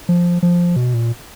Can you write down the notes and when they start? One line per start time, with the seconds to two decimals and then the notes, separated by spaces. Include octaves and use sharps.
0.09 F3
0.43 F3
0.76 B2
0.94 A#2